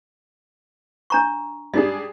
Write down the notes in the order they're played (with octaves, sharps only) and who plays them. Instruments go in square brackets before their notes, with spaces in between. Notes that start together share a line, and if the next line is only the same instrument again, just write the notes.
[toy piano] D4 A#5 C#6
[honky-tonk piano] G3 D4 G#4 [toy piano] D#5